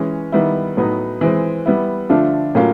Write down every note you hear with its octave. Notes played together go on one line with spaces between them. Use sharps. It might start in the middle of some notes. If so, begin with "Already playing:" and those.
Already playing: E3 G#3 C#4
D#3 G3 B3 E4
A2 F#3 B3 D#4
E3 G#3 C4
G3 B3 E4
D3 F3 A3 D4 F4
A2 F#3 A#3 C#4 F4